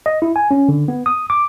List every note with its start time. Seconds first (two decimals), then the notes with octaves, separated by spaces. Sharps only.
0.06 D#5
0.22 E4
0.36 G#5
0.51 C#4
0.69 D3
0.88 B3
1.06 D#6
1.30 D6